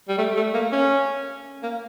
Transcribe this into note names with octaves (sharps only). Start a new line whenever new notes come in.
G3
A3
A3
A#3
C#4
A#3